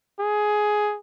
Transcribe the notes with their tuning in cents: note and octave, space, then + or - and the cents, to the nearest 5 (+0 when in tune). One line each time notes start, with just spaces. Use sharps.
G#4 +10